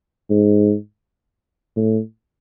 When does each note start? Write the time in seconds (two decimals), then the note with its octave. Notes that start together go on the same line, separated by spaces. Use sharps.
0.30 G#2
1.77 A2